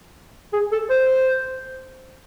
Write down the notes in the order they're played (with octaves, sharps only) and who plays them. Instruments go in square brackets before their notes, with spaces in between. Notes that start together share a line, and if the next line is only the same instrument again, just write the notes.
[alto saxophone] G#4
A4
C5